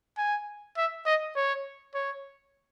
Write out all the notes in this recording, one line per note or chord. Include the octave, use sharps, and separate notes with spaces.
G#5
E5
D#5
C#5
C#5